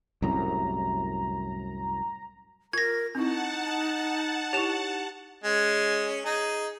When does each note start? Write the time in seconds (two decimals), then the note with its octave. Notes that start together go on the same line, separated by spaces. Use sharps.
0.22 C2 F#2 A2 A#5
2.73 F4 A#4 G#6 A#6
3.15 C4 D#4 E4 F#5 A5
4.53 E4 G4 C#5 E7
5.44 G#3 C#4
6.25 D#4 G#4